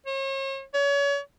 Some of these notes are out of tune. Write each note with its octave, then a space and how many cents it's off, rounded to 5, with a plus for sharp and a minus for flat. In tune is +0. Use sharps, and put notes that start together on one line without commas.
C#5 -40
C#5 +35